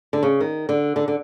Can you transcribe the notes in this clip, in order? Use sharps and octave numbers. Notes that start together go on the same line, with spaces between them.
D3
C#3
D#3
D3
D3
D3